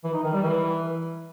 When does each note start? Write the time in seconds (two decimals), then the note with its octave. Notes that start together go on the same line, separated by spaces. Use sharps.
0.04 E3
0.14 D#4
0.23 D#3
0.33 G3
0.42 E3